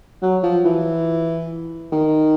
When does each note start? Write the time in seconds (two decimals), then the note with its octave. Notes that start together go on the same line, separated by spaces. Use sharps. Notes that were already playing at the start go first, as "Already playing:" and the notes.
0.22 F#3
0.43 F3
0.65 E3
1.92 D#3